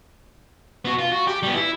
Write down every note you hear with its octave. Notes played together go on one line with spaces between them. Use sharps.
B3 F#4
F4
F#4
G4
G3 B3
E4